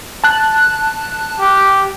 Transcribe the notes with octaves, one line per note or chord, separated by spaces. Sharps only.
A5 F#6
G4